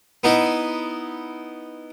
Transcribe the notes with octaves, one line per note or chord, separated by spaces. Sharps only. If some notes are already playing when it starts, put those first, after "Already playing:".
B3 D#4 E4